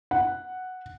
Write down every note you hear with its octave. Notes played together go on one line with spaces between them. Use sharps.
F#5